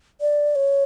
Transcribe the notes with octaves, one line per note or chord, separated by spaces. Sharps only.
D5
C#5